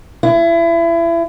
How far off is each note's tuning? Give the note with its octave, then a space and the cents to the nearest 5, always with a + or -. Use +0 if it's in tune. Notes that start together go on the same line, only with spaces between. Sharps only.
E4 +30